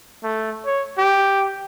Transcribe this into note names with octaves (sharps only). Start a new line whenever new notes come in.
A3
C#5
G4